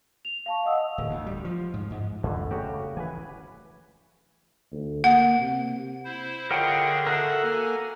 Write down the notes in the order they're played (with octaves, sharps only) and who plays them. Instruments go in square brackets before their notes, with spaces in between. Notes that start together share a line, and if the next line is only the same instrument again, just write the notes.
[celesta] F7
F5 A5 C#6
D#5 F#5 D#6 E6
[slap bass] D1
D2
G3
F3
G#2
G#2
[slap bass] F2 [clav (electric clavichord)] D3
[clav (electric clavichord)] C#3 F#4 G4 [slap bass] A3
[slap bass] E3 [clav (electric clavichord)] B4 G#5
[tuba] D2
[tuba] A#3 [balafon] F#5
[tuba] C3
[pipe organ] E4 C5
[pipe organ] D3 G#4 [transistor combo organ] F4 C#5 D#5 [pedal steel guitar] A#4 F#5 G5
[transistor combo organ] F#4 E5 F#5 [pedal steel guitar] A4 A#4
[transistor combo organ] A#3 [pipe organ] G#5